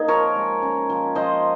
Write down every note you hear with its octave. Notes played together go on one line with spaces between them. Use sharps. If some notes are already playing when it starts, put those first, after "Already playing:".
Already playing: A#3 D#4 G#4
F3 A#4 C#5
G#3
C#4
F3
F3 C5 D#5